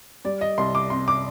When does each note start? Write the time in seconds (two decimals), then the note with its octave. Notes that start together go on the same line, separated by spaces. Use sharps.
0.25 G3 D5
0.41 D#5
0.58 C2 C6
0.75 D6
0.90 C3 C6
1.08 D6